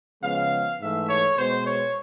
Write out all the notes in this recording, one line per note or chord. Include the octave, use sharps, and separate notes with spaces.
C#3 F3 G#3 B3 F5
G#2 E3 A3 E5
C#5
B2 G#3 B3 C5
C#5